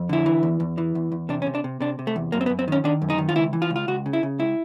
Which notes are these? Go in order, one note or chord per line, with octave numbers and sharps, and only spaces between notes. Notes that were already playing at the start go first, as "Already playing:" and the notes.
Already playing: F2
D3 E4
E3
E2
E2
E3
E2
E2
C3 D4
C#4
C3
D4
C3
C3 D4
C3
A3
E2
F#2 A#3
C4
B3
F#2
C4
D#3 C#4
D#3 D4
F#2
D#4
D#3
F4
C#2 E4
E3
F4
C#2
F4
C#2 F#4
C#3
E4
C#3
C#2 E4